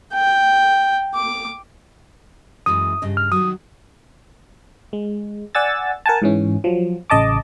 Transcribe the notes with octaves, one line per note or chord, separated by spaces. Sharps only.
G5
D6
F#2 E3 G#3 D#6
G2 C#3 D#5
F6
D#3 F#3 D#6
G#3
D5 F#5 G#5 E6 A6
A#4 F#5 G#5 A5
G#2 E3 C#4
F3 F#3
A1 C#3 D#5 A5 D6